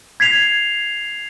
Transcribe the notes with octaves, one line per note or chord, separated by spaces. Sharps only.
G#6 B6 C7 F7